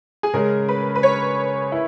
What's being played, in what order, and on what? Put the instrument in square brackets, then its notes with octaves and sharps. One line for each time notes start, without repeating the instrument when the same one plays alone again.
[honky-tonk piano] G#4
[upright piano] C#3 G#3 C#4 G#4 [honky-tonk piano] A#4
[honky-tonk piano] B4
B4
C#5
[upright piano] E4